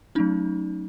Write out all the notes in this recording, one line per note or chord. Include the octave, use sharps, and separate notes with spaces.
F#3 A3 C#4 D#4